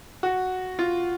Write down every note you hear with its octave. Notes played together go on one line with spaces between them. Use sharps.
F#4
F4